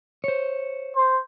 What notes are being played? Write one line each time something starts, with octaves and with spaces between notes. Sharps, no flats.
C5 C#5
C5